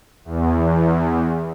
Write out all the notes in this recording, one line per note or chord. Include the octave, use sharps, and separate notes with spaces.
E2